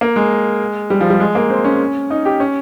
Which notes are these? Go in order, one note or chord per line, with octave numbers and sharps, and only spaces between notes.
A#3
G#3
G3
F3
G3
G#3
A#3
C4
C#4
D#4
G4
C#4